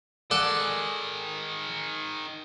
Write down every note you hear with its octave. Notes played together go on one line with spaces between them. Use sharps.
D#3 G#4 A4 D5 F#5